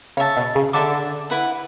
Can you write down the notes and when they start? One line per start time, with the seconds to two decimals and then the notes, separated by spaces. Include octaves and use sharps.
0.17 C#3 C#5 E5 A5
0.37 B2
0.55 C#3
0.73 D3 A4 E5 A5 D6
1.30 E4 B4 F#5